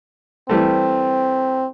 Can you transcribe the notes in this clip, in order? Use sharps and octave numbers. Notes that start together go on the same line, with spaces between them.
E3 G3 A3 C4